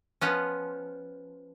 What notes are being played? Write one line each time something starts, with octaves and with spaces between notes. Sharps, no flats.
F3 B3 C#4